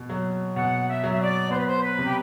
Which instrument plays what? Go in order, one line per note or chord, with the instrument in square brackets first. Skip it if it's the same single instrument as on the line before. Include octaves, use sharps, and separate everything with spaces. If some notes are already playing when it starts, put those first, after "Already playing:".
Already playing: [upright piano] B2
F#3
[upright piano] B2 [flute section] F#5
[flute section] E5
[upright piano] F#3
[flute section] E5
D5
[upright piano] B3 [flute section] C5
[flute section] B4
C5
B4
[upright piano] C3
[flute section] G4